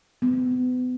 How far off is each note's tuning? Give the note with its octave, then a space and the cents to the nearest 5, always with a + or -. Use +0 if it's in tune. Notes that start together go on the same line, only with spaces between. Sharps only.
B3 +35